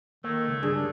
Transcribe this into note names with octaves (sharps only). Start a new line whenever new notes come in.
D#3 A3 A#3
C#2
G2 G#4
D4